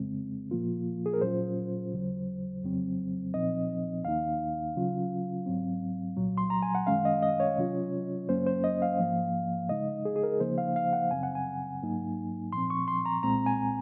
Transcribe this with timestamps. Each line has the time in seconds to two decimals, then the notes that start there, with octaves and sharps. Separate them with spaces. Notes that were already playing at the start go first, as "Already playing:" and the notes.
Already playing: F2 C#3 G#3 C4
0.51 A#2 F3 A#3 F4
1.06 G#4
1.14 A#4
1.21 A#2 F#3 C#4 F4 C5
1.92 D#2 C#3 F#3
2.63 F2 C#3 F#3 C4
3.34 C2 A#2 F3 C4 D#4 D#5
4.05 D#2 D#3 A#3 D#4 F5
4.76 C#3 F#3 C#4 F4
5.46 G#2 F#3 C4
6.16 C2 A#2 F#3
6.38 C6
6.50 A#5
6.62 G#5
6.75 F#5
6.87 F#2 D#3 G#3 C#4 F5
7.05 D#5
7.23 D#5
7.40 C#5
7.57 C3 F#3 C#4 F4
8.28 F#2 C#3 F#3 A#3 C#4 C5
8.46 C5
8.64 D#5
8.82 F5
8.99 G#2 F3 A#3
9.69 C#3 G#3 D#4 D#5
10.05 G#4
10.16 G#4
10.23 A#4
10.40 C#3 F3 A#3 D#4 C5
10.58 F5
10.76 F5
10.93 F#5
11.11 F#2 C#3 F#3 C4 G#5
11.23 F#5
11.35 G#5
11.82 G#2 F#3 A#3 D#4
12.52 A#2 F3 C4 C6
12.70 C#6
12.88 C6
13.06 A#5
13.23 C2 A#2 G#3 C4 A#5
13.46 G#5